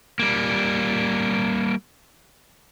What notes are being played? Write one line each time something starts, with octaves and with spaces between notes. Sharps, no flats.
G3 A#3